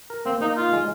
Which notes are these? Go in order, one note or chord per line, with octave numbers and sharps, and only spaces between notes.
A#4
A#3 C4
A#3 D#4
D#4 F4
G#3